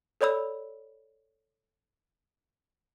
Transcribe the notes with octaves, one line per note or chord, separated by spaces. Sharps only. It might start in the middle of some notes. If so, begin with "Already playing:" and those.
A4 C#5 D5 B5 E6